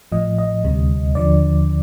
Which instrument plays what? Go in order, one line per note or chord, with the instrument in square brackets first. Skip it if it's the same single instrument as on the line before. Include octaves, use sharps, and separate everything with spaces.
[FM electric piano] A1 A2 F3 D#5
D#5
D2 C3 G3
D#2 D3 F3 D5